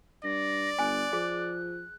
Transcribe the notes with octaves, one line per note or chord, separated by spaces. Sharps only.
G2 D5 A#6
G1 G#5 F#6
F3 G#4